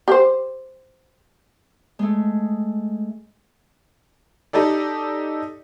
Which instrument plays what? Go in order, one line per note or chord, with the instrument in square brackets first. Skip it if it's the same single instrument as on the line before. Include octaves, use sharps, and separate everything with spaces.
[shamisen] G4 C5
[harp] G#3 A3
[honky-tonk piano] D#4 G4 A4 D5